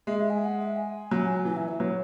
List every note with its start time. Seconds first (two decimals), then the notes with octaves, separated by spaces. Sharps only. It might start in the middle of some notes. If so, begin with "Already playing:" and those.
0.07 G#3 E5
0.19 E5
0.30 G#5
0.42 F#5
0.59 E5
0.77 G#5
1.11 F#3
1.45 E3 G#5
1.57 E5
1.68 B4
1.80 F#3 C#5